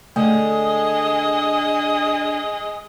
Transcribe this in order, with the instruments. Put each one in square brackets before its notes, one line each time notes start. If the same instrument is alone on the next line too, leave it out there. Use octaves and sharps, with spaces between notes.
[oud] D3 [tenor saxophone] G#3 [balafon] A3 [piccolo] D#6